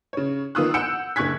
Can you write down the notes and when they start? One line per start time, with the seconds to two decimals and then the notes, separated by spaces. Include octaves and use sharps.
0.13 C#3 C#5
0.55 D#3 B3 F4 D#6 E6 F#6
0.74 F#5 E6 G6 C#7 D7 E7
1.16 F#1 D3 C#6 F#6 G#6 B6